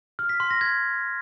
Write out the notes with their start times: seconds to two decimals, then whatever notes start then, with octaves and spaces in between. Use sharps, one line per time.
0.19 F6
0.29 B6
0.40 C6
0.51 A#6
0.61 G#6